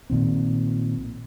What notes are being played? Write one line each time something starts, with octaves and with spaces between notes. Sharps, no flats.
A#1 A#2 D#3 C4